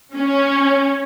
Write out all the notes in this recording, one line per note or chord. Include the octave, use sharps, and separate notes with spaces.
C#4